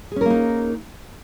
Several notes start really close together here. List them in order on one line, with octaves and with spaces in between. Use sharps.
G#4 C#4 A#4 A#3 D#4